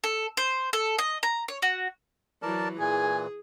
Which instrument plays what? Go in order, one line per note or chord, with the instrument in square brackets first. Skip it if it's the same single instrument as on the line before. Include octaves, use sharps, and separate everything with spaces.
[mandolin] A4
C5
A4
D#5
A#5
C#5
F#4
[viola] E3 F#3 [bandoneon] A#4 D5 A5
[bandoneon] A#2 E3 [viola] G#4 [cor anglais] G#5